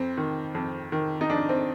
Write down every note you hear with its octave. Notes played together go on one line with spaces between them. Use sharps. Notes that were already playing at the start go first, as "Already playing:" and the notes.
Already playing: F2 C4
D#3
F2
D#3
D#4
F2 D4
C4